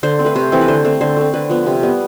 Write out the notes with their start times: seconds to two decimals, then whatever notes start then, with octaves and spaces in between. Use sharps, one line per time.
0.03 D3 C5
0.19 C4
0.25 A3 B4
0.35 C3 C5
0.52 E3 A3 C4
0.61 B4
0.68 D3 C5
0.85 A3 C4
1.01 D3 C5
1.17 A3 C4
1.34 D3 B4
1.49 F3 B3
1.66 C3
1.82 G3 B3